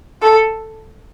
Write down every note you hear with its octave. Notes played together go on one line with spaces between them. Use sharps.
A4